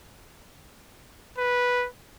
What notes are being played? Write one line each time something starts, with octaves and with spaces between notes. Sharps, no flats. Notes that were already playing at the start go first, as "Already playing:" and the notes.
B4